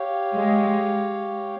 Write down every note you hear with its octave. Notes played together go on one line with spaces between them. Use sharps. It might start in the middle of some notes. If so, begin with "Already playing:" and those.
Already playing: G4 C#5 F5
G#3